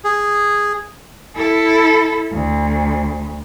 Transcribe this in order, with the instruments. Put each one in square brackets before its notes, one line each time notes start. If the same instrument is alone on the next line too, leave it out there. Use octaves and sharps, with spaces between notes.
[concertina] G#4
[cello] E4 A4
D2